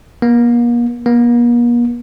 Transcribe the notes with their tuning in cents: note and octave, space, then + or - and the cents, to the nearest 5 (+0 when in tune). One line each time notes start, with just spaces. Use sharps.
A#3 +40
A#3 +45